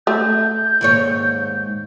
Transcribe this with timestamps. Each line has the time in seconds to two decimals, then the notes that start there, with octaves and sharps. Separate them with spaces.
0.07 A3 G6
0.81 D#2 G#2 C#5